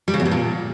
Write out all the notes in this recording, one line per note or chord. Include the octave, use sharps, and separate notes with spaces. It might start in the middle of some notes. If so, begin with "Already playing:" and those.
G3
C#3
E2
G2
A#2